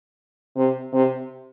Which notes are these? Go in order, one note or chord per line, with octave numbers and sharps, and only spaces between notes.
C3
C3